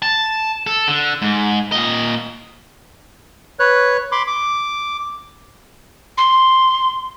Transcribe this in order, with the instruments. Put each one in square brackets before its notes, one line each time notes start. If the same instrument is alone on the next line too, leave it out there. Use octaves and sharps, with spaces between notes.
[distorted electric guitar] A5
A4
D3
G#2
A#2 D#5
[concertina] B4 C#5 F#6
B5 C6 D6
D6
[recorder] C6